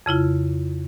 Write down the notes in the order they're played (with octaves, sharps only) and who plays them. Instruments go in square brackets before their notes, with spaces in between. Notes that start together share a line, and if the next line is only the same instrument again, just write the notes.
[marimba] F2 C#3 E4 F4